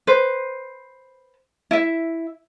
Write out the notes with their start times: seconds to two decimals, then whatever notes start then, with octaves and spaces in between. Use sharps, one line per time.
0.07 B4 C5
1.71 E4 E5